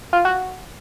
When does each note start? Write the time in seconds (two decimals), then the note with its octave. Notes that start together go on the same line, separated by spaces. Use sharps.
0.13 F4
0.25 F#4